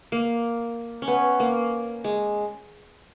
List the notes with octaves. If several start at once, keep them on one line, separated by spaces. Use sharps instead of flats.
A#3
C#4
B3
A#3
G#3